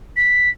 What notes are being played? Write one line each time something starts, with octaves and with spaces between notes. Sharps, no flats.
B6